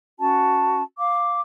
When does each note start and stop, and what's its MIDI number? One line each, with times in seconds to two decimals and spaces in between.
0.19 0.82 61
0.19 0.82 66
0.19 0.82 81
0.97 1.40 77
0.97 1.40 86